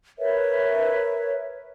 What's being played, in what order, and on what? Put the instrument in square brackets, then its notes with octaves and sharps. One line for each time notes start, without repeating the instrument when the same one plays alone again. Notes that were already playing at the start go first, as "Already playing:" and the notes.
[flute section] A#4 B4 C#5 E5